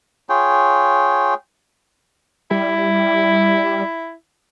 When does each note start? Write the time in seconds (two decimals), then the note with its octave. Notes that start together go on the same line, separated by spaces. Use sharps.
0.29 F4 G#4 C#5 G5
2.51 G3 E4